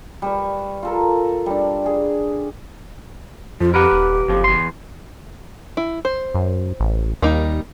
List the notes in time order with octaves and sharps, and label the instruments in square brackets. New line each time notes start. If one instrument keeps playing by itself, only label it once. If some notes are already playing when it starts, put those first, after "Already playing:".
[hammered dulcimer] G3 B4 C#6
F4 A4 A#4
G3 D4
G#4
[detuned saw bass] F2 [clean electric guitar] F3 [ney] F4
[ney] G4 [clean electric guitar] A#4 B4 F#5
[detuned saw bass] D#1
[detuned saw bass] F#1 [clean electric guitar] F2 F3
[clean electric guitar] E2 C6
[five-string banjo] E4
C5
[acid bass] F#2
A1
[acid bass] D#2 [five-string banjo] G3 A#3 D#4